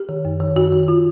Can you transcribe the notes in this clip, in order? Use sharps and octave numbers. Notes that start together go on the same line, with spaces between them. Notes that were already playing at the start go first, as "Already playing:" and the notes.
Already playing: G4
D#3
F#2
D#3
F#2 F#4
D#3
F4